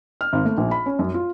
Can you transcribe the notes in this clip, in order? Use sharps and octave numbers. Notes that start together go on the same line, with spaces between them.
F6
G#1
A3
A#1
B5
C#4
F#2
F4